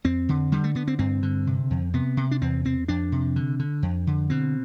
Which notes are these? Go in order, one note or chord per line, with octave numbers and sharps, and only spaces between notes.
F2 C4
D3
D3 G3
A3
D3 B3
C4
G2 C4
D3
C3
F2
C3 B3
C3
D4
E2 C4
E2 C4
F2 D4
C3
D3
D3
F2
D3
B2 C4